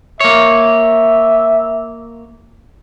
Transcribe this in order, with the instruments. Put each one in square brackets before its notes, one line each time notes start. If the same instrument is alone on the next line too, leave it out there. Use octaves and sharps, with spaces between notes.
[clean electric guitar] A#3 C#5 [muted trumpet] E5